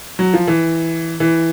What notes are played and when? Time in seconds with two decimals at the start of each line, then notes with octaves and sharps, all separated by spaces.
0.19 F#3
0.34 F3
0.48 E3
1.20 E3